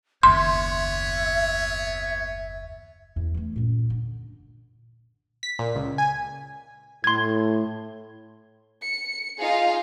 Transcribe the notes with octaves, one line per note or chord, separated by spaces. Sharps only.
F#1 D#2 B3 C#5 E5 C6
E2
E3 A3
F#2 A#2
D3
B6
A#2
C#2
G#5
A2 C6 G#6
C#7
D#4 F4 G#4 F5